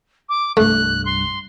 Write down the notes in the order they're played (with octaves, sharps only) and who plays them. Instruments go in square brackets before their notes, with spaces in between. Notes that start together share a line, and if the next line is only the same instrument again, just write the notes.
[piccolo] D6
[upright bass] C2 G2 [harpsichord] A3 [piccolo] F#6
[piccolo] C6